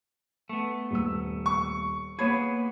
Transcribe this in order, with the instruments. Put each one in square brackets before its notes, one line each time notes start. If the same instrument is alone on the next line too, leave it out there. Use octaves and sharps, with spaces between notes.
[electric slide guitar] A3 B3
[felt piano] D#1 E6
[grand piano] C#6
[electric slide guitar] A#3 B3 G#4 [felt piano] C#5 B5 G#6